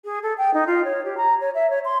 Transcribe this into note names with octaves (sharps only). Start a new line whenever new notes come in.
G#4
A4
G5
D#4
F4
C#5
G4
A#5
C#5
E5
C#5
C6